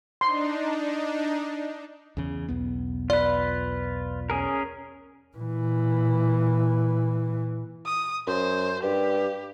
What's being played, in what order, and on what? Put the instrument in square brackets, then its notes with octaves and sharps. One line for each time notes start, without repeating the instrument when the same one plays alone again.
[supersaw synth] D4 D#4 [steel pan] C6
[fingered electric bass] E2 C#3
B1 E2 B3
[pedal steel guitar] F4 B4 [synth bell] D5
[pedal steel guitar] C#4 G#4 A#4
[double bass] A#2 E3
[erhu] D#6
[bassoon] F#2 [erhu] C5
[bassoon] G2 [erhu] G4